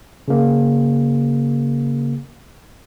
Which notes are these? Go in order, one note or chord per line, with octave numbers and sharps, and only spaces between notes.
C#3 A#3